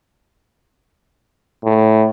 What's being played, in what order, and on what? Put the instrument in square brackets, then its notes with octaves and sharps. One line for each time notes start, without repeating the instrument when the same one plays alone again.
[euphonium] A2